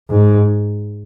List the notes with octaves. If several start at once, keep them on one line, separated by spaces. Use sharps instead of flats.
G#2